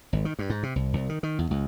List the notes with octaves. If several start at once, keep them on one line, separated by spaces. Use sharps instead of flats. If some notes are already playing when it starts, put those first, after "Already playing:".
G#1
D#3
G2
G#2
C3
C2
C2
D#3
D#3
E2
C#2